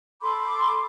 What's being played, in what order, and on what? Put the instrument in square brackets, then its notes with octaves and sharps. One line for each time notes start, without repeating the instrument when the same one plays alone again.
[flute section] A4 B5 C6 D6